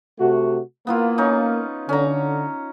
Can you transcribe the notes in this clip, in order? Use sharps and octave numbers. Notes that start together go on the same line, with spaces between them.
C3 A3 F#4
A#3 B3 E4 F4
C#4 D#4
D3 C#4 A#5